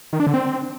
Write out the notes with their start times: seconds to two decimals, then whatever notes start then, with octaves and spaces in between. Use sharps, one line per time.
0.13 D#3
0.20 D4
0.27 D3
0.34 C4